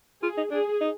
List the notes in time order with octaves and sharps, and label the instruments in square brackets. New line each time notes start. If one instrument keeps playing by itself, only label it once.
[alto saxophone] F4 [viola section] G#4
[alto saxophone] D#4
[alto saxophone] D4 [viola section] G#4
[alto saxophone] D#4